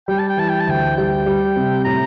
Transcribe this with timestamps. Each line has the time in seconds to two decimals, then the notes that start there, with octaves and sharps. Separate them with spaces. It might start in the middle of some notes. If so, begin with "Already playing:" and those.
0.08 G3 G5
0.19 A5
0.29 G5
0.37 E3 A5
0.49 G5
0.60 A5
0.67 D2 G5
0.97 G3 G5
1.26 G3
1.56 C3
1.85 A2 A#5